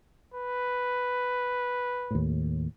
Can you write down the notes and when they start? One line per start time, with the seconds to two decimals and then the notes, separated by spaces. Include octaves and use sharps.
0.34 B4
2.11 D#2 A2